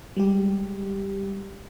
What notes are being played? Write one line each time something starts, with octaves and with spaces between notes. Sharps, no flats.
G3 G#3 G4